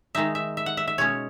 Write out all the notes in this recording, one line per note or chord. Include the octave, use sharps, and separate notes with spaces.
D#3 G#3 D#4 E5
E5
E5
F#5
E5
E5
B2 G#3 C#4 C#5